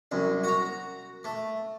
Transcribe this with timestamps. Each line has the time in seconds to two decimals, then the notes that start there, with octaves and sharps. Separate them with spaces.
0.12 C2 F#2
0.44 F#4 A#5
1.24 A3